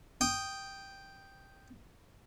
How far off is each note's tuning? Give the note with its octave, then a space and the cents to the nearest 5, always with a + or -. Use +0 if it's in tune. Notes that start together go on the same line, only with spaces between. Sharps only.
G5 +0 D#6 -5